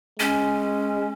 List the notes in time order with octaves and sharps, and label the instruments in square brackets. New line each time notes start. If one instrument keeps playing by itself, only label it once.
[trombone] G#3 [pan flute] C#4